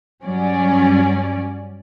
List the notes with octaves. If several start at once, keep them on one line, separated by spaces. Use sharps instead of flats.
G2 F#3 C#4 D5